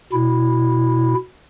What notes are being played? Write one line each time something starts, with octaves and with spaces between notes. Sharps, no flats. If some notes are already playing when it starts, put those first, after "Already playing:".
B2 E4